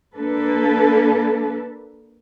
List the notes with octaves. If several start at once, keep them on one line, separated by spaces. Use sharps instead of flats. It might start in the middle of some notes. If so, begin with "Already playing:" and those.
A#3 D4 A4 B4